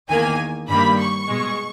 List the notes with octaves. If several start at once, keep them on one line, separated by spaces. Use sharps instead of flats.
E2 D#3 A#3 G#5
G2 D#3 G3 A#3 B5
C#6
B2 G#3